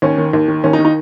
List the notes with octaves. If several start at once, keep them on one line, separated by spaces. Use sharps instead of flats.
D#2 C#4
D#3
D#2
D#3
D#2 C#4
D#4
D#3
D#4